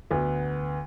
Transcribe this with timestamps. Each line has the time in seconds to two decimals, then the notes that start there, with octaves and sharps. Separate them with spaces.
0.11 D2 B3